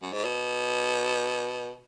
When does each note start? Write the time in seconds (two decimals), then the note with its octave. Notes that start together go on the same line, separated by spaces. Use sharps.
0.02 F#2
0.13 G#2
0.25 B2